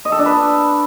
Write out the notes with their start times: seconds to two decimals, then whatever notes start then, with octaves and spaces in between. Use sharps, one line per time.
0.05 D#5
0.12 A4
0.19 D4
0.26 B4